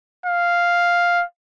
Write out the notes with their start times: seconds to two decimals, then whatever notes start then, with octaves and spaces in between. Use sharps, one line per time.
0.26 F5